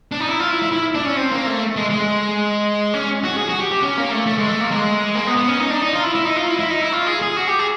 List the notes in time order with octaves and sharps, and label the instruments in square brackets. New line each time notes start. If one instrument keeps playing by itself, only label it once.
[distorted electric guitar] D4
D#4
E4
F4
E4
E4
E4
D4
C#4
C4
A#3
A3
G#3
G#3
C#4
F#4
G#4
F#4
G4
G4
C#4
A#3
A3
A3
G#3
A3
A#3
G#3
A#3
B3
B3
C#4
D#4
D4
D#4
F4
E4
E4
D#4
F4
E4
E4
D#4
E4
F4
G#4
G#4
F#4
G4
G#4